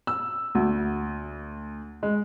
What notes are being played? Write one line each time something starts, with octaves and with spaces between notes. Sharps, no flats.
E6
D2
G#3